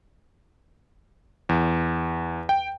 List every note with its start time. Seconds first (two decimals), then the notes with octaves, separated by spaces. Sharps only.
1.49 E2
2.49 G5